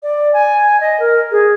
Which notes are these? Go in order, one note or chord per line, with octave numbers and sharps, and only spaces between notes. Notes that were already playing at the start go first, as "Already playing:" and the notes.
D5
G#5
D#5
A#4
G#4